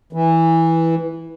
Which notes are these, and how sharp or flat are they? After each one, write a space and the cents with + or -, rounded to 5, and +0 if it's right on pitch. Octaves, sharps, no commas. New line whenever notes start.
E3 -5